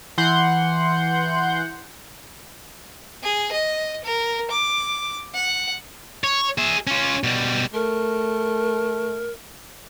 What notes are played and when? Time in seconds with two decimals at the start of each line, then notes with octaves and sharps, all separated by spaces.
0.18 E3 F#5 C6 G6
3.23 G#4
3.52 D#5
4.04 A#4
4.51 D6
5.34 F#5
6.24 C#5
6.58 G#4 E5
6.87 C#4 F4
7.24 B2 G3
7.74 A3 A#4